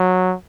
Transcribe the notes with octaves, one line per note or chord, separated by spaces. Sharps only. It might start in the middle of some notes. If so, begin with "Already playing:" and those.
Already playing: F#3